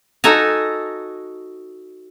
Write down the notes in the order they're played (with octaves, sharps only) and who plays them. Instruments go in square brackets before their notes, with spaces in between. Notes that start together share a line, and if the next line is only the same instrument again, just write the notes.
[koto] D#4 F#4 A4 G#5 A#5